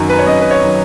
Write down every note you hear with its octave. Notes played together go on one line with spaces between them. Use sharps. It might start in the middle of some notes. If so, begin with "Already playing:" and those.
Already playing: F#2 D#3 F#3
B4
C#5
F#2 D#5
B4
C#5
D#3 F#3